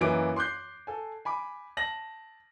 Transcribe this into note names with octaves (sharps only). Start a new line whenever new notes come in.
F#2 E3 A#3 D#5 D6 D7
C6 D6 F#6 G6 C7
A4 G#5
G#5 B5 D6
A5 A#6 F#7